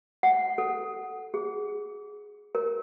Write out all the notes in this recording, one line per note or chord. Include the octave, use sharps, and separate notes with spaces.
F#5
A4
G#4
A#4